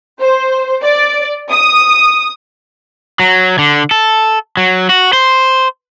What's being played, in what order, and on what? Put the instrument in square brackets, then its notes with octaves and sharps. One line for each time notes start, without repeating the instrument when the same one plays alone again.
[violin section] C5
D5
D#6
[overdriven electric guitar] F#3
D3
A4
F#3
F#4
C5